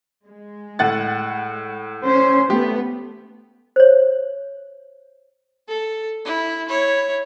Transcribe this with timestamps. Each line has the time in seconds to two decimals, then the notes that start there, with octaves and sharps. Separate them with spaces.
0.24 G#3
0.79 A2 F#5 A6
2.04 C#4 C5
2.50 A3 B3 G4
3.76 C5 C#5
5.68 A4
6.25 E4
6.68 E4 C#5